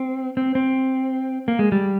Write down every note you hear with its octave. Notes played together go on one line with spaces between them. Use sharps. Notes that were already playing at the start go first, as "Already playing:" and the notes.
Already playing: C4
C4
C4
A#3
G#3
G3